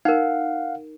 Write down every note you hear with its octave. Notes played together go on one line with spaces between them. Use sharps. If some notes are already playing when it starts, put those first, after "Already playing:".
D#4 A#4 F5 F#5